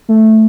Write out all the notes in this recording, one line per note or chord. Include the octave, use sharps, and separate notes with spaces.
A3